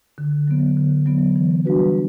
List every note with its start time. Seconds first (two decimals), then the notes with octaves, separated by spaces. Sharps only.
0.18 D3
0.48 F#3 B3
0.77 D3
1.06 F#3 B3
1.36 E3
1.65 G3 D4 F#4 B4